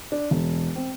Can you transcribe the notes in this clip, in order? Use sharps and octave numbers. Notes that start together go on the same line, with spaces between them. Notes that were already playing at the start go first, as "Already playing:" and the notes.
D4
E1
C4